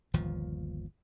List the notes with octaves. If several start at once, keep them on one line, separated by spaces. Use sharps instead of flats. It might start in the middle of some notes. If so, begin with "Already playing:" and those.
G1 D#2 A#2 F3